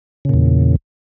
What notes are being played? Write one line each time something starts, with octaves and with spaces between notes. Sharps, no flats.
E2 A#2 C#3